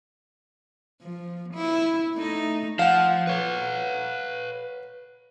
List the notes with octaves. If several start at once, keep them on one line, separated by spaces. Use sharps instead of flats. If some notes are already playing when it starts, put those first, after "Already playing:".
F3
E4
A3 D#4
F3 F5 F#5
B4 C#5